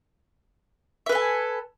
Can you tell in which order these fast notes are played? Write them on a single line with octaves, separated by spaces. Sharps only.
E5 B4 A4 G#5